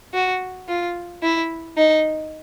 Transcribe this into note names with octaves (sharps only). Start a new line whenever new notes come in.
F#4
F4
E4
D#4